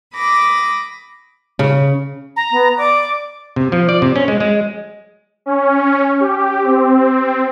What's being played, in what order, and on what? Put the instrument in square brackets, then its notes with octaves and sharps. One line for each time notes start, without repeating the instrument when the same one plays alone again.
[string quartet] B5 D6 D#6 A#6
[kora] C#3
[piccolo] A#5
[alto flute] B3
[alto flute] D5 [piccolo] D6
[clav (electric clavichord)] C3
F3
D5
C3
C#4
G#3
G#3
[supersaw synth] C#4
G4
C4